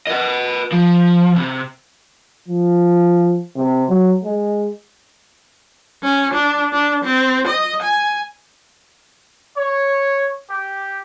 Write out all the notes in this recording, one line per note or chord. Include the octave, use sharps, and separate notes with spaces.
B4 D#5
F3
C3
F3
C3
F#3
G#3
C#4
D4
D4
C4
D#5
G#5
C#5
G4